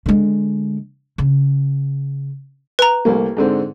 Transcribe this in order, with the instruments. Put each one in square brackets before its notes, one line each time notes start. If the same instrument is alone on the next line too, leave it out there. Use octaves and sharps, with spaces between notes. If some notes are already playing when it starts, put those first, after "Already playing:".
[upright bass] D3 G#3
C#3
[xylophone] B4 A#5
[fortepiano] C2 A3 A#3
G#2 D3 C4